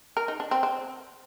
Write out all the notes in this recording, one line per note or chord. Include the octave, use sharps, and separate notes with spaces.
A#4
D#4
D4
C4
C4